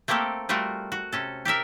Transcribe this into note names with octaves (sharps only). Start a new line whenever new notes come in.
A3 A#3 C4 G4 A4 A#4
G3 A3 F4 F#4 A#4
F#4
C3 C#4 A4
G4 A4 A#4 E5